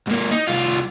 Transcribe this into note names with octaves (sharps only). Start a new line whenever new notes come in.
G#2 A#3
D#4
C2 F4